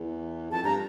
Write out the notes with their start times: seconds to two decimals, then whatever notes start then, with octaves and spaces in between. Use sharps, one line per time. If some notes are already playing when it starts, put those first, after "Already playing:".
Already playing: E2
0.51 F2 A5
0.63 G2 A#5